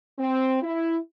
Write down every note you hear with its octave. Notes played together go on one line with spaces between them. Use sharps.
C4
E4